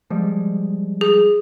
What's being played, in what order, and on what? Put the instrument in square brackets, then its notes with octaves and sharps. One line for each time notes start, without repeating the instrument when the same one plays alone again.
[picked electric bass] F3 G3 G#3
[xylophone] G#4